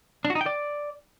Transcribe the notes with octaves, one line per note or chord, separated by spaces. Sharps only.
D4
F#4
D#4
G5
D5